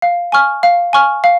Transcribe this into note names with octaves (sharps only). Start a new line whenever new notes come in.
F5
G#5 C#6 F6
F5
G#5 C#6 F6
F5